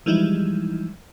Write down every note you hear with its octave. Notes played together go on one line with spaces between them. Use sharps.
E3 F3 G3 G#3 D#4 E4